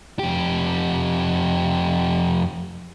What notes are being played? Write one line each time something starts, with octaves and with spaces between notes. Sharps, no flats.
F2 G4